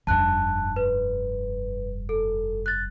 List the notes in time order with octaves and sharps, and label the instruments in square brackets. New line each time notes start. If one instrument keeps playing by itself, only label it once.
[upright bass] F1 G2 [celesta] A5 F#6
[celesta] B4
A4
F#6 A6